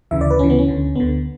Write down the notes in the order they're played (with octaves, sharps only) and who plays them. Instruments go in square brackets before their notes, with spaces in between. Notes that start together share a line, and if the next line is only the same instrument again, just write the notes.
[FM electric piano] D2 C#3 E3 E5
D5
B4
D2 C#3 E3 C#4
B3
C#4
D2 D3
D2 D3 B3